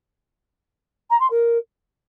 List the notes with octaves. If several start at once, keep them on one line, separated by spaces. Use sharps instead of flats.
A#5
C6
A#4